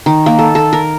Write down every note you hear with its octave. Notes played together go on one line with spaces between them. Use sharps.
D#3
A#3
A4
A4
A#4